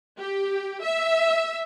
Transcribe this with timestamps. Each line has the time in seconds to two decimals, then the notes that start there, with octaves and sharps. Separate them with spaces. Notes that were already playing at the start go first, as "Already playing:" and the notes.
0.18 G4
0.82 E5